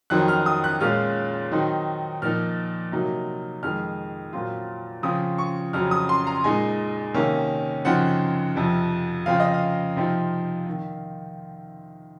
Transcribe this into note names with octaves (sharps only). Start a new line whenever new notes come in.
F2 D#3 F#3 C4 F#6
F6
D#6
F#6
A#2 G#3 C#4 F4 F6
D#3 F#3 C4 D#4
A#2 F3 A#3 D#4 F6
C3 F#3 A#3 D#4
F2 D#3 G#3 F6
A#2 F#3 C4 F4
C#3 F3 C4 F4 D#6
C#6
F2 C#3 F#3 C4 F6
D#6
C6
A#5
A#2 G#3 D#4 G#5
C3 D#3 A#3 C#4
F#2 C#3 F3 C4 D#4 F#5
F2 C3 F3
C#3 F3 C4 F5
D#5
F5
C3 F3 C4 D#4
D#3